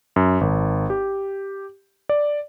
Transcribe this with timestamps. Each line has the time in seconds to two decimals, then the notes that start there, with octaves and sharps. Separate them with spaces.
0.16 F#2
0.41 G#1
0.90 G4
2.09 D5